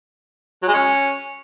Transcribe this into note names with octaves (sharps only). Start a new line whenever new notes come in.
F#3
G#3
C#4